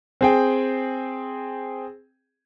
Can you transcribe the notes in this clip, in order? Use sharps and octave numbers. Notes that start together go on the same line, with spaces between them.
C4 G#4 G5